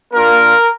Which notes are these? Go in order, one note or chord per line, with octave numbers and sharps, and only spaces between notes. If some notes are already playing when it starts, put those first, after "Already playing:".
A#3 D4 F4 A#4